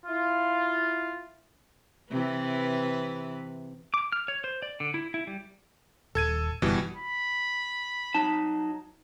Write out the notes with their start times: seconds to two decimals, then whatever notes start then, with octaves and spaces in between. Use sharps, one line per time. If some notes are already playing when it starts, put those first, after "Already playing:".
0.06 E4 F4
2.11 C3 E3 B4
3.94 D6
4.12 F6
4.28 C#5
4.44 C5
4.62 D5
4.80 D3
4.94 E4
5.14 E4
5.27 G3
6.15 D#1 A4 G#6 D#7
6.62 F#1 B2 E3 G3
6.96 B5
8.14 F#3 D#4 A5